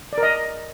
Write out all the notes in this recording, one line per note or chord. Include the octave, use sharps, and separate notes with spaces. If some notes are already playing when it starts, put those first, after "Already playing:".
D5
A#4
D#5